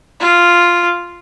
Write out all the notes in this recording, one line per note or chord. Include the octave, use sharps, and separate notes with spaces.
F4